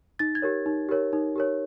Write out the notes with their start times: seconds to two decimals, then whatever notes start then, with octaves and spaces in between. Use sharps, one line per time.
0.19 D#4 A6
0.35 G#6
0.42 G4 A#4 C#5
0.66 D#4
0.89 G4 A#4 C#5
1.13 D#4
1.36 G4 A#4 C#5